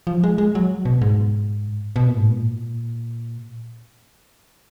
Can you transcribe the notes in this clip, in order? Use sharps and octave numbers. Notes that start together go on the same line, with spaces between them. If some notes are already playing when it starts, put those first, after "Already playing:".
F3
G#3
G#3
F#3
B2
G#2
B2
A#2
G#2
A#2